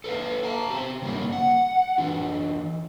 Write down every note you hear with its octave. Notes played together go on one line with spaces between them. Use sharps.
A4 B4 C#5 F5
F5 A5 A#5
G4 C5 E5
C#3 G3 A#3 C#4
F#5
E3 D4 F4